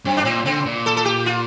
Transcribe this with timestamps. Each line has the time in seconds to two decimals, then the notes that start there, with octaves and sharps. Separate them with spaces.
0.05 G2 C4
0.17 D4
0.25 A#2 C4
0.45 D3 C4
0.66 A#2
0.86 A4
0.97 A4
1.05 G4
1.26 F4